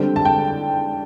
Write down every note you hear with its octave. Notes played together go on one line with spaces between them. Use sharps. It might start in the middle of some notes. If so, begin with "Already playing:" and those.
Already playing: D3 G3 C4 G5
A5
G5